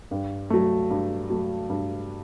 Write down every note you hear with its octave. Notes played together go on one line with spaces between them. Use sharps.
G2
F#3 A3
G2
F#3 A3
G2